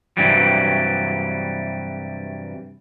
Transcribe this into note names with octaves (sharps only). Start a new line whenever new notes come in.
G2 C3 E3 F#3 G3